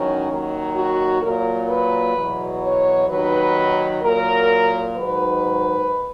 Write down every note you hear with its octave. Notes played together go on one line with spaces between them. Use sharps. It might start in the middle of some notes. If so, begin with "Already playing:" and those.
Already playing: E2 D#3 F#3 C#4
D#2 D#3 F#3
F#4
A#2 F#3 A#4
B4
E2 B2 F#3
C#5
D#2 D#3 F#3 B4
A#2 F#3 A#4
G#2 D#3 F#3 B4